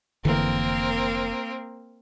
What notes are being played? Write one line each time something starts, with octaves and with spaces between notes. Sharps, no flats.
F1 D3 E3 A#3 C4 A#4